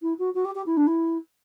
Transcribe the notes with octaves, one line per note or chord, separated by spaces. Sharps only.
E4
F#4
F#4
G4
G4
E4
D4
E4